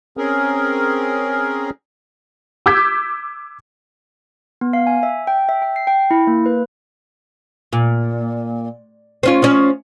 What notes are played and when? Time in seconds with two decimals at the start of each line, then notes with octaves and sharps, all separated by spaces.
0.17 C4 C#4 G#4 A#4
2.66 D6 E6 G6 G#6 B6
4.61 B3
4.73 F5
4.87 G#5
5.03 E5
5.27 G5
5.49 E5
5.62 G5
5.76 C7
5.87 G5
6.11 E4
6.27 A#3
6.46 B4
7.73 A#2
9.23 C4 C#4 F4
9.42 F3 C#4